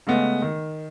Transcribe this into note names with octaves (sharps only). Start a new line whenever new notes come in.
C#3 G#3 A3 B3
D#3